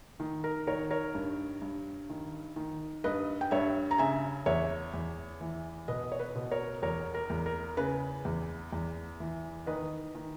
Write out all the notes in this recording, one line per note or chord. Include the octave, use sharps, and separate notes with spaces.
D#3
A#4
D#3 A#4 C#5
A#4 C#5
G2
G2
D#3
D#3
G2 B4 D#5
G5
G2 C#5 E5
A#5
C#3 E5 G#5
E2 C#5 E5
E2
E3
B2 B4 D#5
C#5
B4
B2
A#4 C#5
E2 A#4 C#5
A#4
E2
A#4
C#3 B4
E2
E2
E3
D#3 B4 D#5
D#3